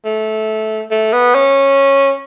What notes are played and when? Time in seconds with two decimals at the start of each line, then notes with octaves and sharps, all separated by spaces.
0.05 A3
0.91 A3
1.13 B3
1.35 C#4